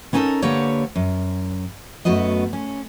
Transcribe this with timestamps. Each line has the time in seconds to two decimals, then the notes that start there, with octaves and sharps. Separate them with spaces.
0.13 B3 C#4 D#4 F#4 A4 A#4
0.42 D3 A#3 G4 B4 C#5 F#5
0.96 F#2
2.05 F#2 A3 B3 F#4 D#5
2.53 C#4